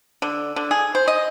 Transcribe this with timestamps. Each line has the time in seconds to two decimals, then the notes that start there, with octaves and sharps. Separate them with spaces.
0.22 D3
0.56 D3
0.71 G#4
0.95 C5
1.08 D#5